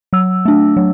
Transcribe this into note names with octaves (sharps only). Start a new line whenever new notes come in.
F#3 E6
A3 D4
F#3